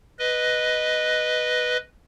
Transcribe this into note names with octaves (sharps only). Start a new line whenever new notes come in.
B4 D#5